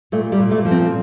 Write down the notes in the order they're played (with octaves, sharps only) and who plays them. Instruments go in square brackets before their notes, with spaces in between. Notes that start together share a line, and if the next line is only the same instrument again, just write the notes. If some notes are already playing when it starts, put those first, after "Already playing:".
[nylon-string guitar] A#2 A3
G3
A#2
A3
F3
C4